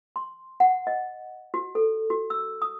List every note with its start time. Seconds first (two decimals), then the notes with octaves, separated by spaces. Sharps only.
0.16 C6
0.60 F#5
0.87 D#5
1.54 F#4
1.75 A4
2.10 F#4
2.30 E6
2.62 D#6